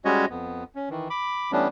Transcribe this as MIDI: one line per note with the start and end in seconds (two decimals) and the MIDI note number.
0.05 0.25 55
0.05 0.25 56
0.05 0.25 61
0.05 0.25 66
0.05 0.25 73
0.05 0.25 75
0.30 0.64 41
0.30 0.64 59
0.75 0.89 61
0.90 1.08 51
0.90 1.08 52
1.10 1.52 83
1.10 1.52 86
1.52 1.68 52
1.52 1.68 55
1.52 1.68 57
1.52 1.68 59
1.52 1.68 61
1.52 1.68 62